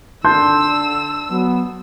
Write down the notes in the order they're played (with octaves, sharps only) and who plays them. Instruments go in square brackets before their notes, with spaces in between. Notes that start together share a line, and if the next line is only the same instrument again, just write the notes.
[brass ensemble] D3 [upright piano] A5 C6 G6 [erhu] E6
[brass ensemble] F#3 B3